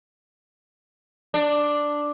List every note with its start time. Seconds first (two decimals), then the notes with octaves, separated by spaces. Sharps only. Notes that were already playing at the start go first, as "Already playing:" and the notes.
1.34 D4